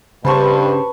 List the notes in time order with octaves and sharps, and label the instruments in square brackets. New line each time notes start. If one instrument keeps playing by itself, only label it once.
[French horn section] G2 [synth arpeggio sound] C#3 [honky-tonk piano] C4 C5 [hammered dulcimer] B4 A5 C#6